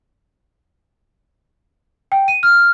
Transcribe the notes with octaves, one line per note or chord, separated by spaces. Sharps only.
G5
D#7
F6